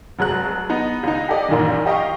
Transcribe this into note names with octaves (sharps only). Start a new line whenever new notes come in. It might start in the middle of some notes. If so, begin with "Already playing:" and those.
F1 F#3 G#3 F#6
B3 D#4
C#2 D#4
G4 A4 D5 D#5
A#1 F#2 A#2 D#3 E3
G4 D#5 F5 G5 C#6